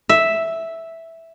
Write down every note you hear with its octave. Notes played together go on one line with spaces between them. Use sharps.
E5